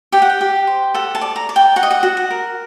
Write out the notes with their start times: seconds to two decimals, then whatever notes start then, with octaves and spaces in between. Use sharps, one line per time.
0.12 G4 G5
0.22 F#5
0.30 G5
0.41 G4
0.67 C5
0.94 A4 F#5
1.15 A5
1.21 D5
1.36 A#5
1.49 D5
1.56 G5
1.76 F#4 F#5
1.83 D#5
1.91 F#5
2.03 F#4
2.17 F#5
2.30 A#4